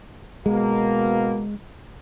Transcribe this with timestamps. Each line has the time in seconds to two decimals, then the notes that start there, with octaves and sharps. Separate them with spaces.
0.46 B2 G#3 A#3